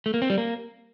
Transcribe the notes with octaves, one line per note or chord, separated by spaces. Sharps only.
A3
A#3
C4
G3
A#3